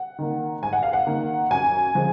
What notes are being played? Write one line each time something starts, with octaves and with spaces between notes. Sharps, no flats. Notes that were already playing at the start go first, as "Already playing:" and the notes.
Already playing: F#5
D#3 A#3
G#2 G#5
F#5
F5
F#5
D#3 A#3
F#2 G#5
F3 G#3